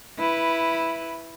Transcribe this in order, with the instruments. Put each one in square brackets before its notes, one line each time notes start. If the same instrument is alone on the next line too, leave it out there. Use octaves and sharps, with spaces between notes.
[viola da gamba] E4 B4